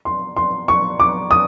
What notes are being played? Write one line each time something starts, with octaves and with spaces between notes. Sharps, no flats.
C6
C6
C#6
D6
D#6